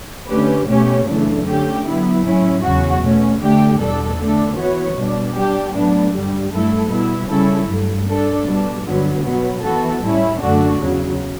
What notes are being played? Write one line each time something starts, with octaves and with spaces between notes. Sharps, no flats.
D3 A3 C#4 G4 B4
B2 A3 C#4 G4 C#5
F#2 C#3 E3 A3 D4
D3 A3 C#4 G4
F#3 B3 E4
A2 F#3 C#4 E4
E2 C#3 F#3 C#4 F#4
B2 A3 C#4
D3 A3 D4 G4
E2 B2 G3 D4 A4
D3 A3 D4 A4
E3 B3 F#4 C#5
B2 G3 D4
G3 D4 G4
A2 F#3 B3 D4
G2 D3 G3
G2 F#3 A3 E4 A4
B2 G3 B3 E4
C#3 G3 C#4 E4 A4
G2 F#3 A3
G3 D4 A4
B2 G3 D4
G2 D3 F#3 B3
B2 F#3 B3
E3 B3 F#4 A4
A2 G3 C#4 E4
F#2 D3 A3 D4 F#4
E2 C#3 F#3